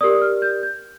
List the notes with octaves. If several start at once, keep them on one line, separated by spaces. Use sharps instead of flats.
G4 A#4 D5 D#6
F6
G6
G6